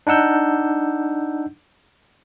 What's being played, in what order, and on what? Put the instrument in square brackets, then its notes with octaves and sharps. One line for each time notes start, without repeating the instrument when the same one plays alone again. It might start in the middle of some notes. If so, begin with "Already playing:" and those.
[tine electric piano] D4 D#4 F#5 E6 G6